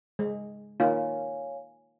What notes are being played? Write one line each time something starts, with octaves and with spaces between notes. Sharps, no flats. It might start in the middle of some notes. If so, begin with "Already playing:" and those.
G#3
A#3 D#4 F4 C#5 F5 G#5